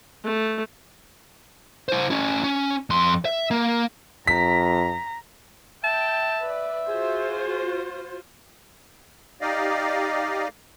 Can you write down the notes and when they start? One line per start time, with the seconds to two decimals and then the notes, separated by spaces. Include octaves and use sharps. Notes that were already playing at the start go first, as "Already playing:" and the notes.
0.24 A3
1.88 E4 C5
2.10 C#4 E4
2.44 C#4
2.90 F2 C6
3.25 E5
3.51 A#3
4.27 F2 A#5 B6
5.84 E5 G5 A5
6.41 B4 D5
6.88 F4 F#4 G#4 C5
9.41 D#4 G4 D5 D#5 F5